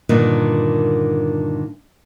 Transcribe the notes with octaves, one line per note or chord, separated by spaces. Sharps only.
G2 A#2 D3 D#3